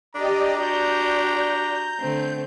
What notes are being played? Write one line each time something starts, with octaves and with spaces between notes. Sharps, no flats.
D4 G4 D5 D#5 A#5
F#4 G4 D5 A#5 G6
D3 A3 C4